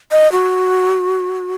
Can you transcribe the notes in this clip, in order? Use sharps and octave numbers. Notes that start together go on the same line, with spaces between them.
D#5
F#4